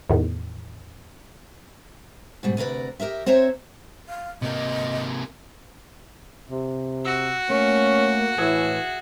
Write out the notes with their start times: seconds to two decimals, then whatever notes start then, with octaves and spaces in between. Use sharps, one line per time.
0.10 E2 A2 D#3
2.43 G#2 B2 G3
2.57 D2 C3 A#4 B4 D5
3.00 G4 A#4 D#5 E5
3.26 C4 C5 C#5 E5 A#5
4.09 F5
4.42 C3 A#3 D#5
6.50 C3
7.05 F#4 E6
7.50 A3 A#3 C#4
8.38 A2 E3 G#4 E5 G#5